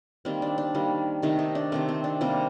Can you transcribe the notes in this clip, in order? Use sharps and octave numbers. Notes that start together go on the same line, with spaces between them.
D#3 G3 A#3 C4
D4
D4
D#3 G3 A#3
C3 D#3 A3 D#4
D#4
D4
C3 D#3 A3 C4
C4
D4
C3 G3 A#3 C4